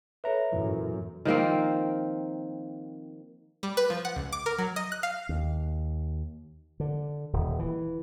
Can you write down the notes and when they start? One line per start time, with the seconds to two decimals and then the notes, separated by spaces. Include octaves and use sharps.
0.24 A4 B4 C#5 E5 A#5
0.53 F#2 A#2 E3
1.25 D#3 F3 A#3 C4
3.63 G3
3.77 B4
3.90 F3
4.05 F#5
4.16 C#2
4.33 D6
4.46 A#4
4.58 F#3
4.76 D#5
4.92 F#6
5.03 F5
5.29 D#2
6.80 D3
7.33 D#1
7.59 E3